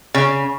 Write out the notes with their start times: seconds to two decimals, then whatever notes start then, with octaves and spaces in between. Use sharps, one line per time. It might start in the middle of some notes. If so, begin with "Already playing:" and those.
0.14 C#3